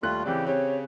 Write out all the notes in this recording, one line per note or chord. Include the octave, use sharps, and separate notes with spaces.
D#2 G3 A3 F4 F#6
C#3 E3 C4 G4 D5
C4 G4 C#5